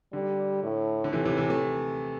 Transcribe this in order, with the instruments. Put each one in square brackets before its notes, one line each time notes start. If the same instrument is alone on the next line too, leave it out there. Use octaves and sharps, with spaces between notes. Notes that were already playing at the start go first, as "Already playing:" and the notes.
[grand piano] D3 [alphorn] G3
[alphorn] A2
[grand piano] D3
[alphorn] A2 [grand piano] C3 E3
[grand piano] C3 E3
C3 E3
E3 A3